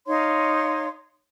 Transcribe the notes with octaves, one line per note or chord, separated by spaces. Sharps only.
D#4 C#5 F5 C6